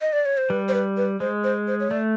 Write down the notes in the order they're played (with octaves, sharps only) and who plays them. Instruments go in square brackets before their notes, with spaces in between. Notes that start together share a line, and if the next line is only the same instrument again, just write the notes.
[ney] D#5
D5
C#5
C5
[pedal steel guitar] G3 [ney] B4
[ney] C5
B4
B4
[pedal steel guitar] G#3 [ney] C5
[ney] C5
C5
C#5
[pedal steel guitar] A3 [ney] D5